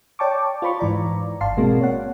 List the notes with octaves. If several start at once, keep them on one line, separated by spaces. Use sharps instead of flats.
C#5 D5 G5 A5 C#6 D6
F4 C5 B5 C#6
G#2 E3 D5 A#5
G1 D5 F5 A5 C6 C7
B2 G#3 A#3 C4 F#4
C#5 F#5